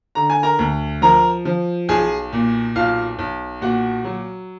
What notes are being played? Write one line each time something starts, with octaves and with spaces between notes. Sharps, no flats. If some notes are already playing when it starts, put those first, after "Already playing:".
D3 A#5
G#5
A#4 A#5
D2
F3 A#4 A#5
F3
B1 G#4 G#5
A#2
B1 F4 F5
B1
A#2 F#4 F#5
F#3